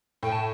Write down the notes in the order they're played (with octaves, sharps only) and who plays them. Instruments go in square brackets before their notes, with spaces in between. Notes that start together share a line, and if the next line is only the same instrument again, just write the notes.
[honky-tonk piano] A2 [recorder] G5
[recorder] A5